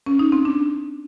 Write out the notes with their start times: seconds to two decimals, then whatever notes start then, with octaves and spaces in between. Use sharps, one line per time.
0.06 C#4
0.19 D#4
0.32 C4
0.45 D4